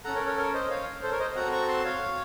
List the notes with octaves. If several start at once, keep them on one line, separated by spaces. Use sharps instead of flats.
C#4 A4 F#5 A#5
A#4 C#5
A#4 C#5
A#4 C#5
C5 D#5
C#5 F5
A4 C5
A#4 C#5
C5 D#5
C4 F#4 A4 F#5 A#5
A#5 C#6
A5 C6
C#5 F5